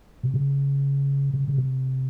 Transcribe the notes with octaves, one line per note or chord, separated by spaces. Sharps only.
C3
C#3
C#3
C#3
C3